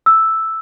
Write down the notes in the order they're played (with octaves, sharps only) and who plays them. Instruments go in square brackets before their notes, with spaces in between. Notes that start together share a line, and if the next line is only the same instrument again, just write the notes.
[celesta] E6